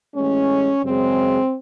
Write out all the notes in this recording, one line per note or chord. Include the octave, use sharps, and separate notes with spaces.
A1 A2 G#3 C#4
F#2 C#3 G#3 C4